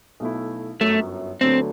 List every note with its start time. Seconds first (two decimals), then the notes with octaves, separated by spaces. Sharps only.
0.20 B1 B2 A3 E4
0.80 G1 F#2 F#3 A3
1.41 D2 D3 F#3 B3 C4 D4